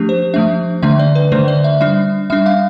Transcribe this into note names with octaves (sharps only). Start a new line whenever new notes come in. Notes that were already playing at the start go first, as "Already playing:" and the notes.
Already playing: F3 A3 D4 G4
C5
F3 A3 D4 E5
D3 A3 D4 E5
D5
B4
D3 A3 D4 C5
D5
E5
G3 D4 E5
G3 D4 E5
F5